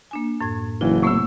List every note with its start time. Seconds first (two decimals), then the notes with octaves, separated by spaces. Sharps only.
0.11 A#3 D4 G#5
0.41 F#2 A2 G#6
0.81 F#1 E3 F4
1.03 C3 A3 B3 C#6 E6